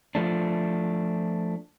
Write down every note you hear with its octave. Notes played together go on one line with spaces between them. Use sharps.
F3 A3 D4